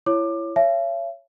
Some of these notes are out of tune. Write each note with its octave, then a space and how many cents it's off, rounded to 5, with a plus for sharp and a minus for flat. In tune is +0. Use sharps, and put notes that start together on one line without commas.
E4 +25 C#5 +0 D6 +20
C#5 +0 E5 +45 G#5 +45